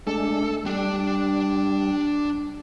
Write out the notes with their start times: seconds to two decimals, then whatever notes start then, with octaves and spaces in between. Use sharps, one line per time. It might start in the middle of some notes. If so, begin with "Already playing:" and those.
0.07 G#3 A3 D4 A4
0.66 G3 D4 D5